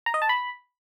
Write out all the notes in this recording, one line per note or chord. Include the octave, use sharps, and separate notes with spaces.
A#5
D#5
A5
B5